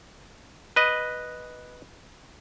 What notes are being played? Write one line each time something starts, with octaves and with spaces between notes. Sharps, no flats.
B4 D#5